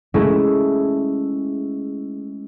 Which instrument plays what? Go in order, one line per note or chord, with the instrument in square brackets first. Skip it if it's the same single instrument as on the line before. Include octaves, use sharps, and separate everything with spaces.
[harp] G#3 A3 C#4 E4